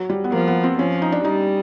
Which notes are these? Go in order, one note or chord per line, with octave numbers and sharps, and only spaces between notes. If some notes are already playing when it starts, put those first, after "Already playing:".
Already playing: F#3
G3
B3
F3 A#3
B3
C4
F3 C#4
D#4
D4
G3 D#4